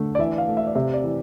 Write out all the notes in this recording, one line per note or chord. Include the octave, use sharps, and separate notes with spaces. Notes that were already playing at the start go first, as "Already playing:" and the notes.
Already playing: D3 A3
D5
E3 E5
F5
A3
E5
D5
C3 E5
D5
E3